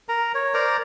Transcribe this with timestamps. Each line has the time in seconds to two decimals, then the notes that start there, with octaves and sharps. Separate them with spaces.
0.09 A#4 A#5
0.34 C#5
0.54 A#4 C5 D5 A#5